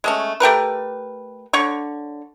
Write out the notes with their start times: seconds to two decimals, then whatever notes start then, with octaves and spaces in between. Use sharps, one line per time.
0.04 G#3 A3 C#4
0.40 A3 G4 A#4 B4
1.53 D3 C#5 C#6